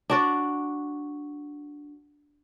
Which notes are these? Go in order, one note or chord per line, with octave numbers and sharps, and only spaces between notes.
D4 F#4 D5